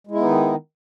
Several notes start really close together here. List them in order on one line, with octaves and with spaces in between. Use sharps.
G#3 E4 B3 D#4 D#3